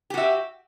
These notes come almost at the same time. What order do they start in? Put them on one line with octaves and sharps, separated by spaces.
G4 F#4 E5